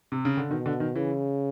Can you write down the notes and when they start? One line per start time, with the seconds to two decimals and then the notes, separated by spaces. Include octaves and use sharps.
0.12 C3
0.25 C#3
0.37 D3
0.50 B2 D#3
0.66 D3
0.80 D#3
0.95 C#3 E3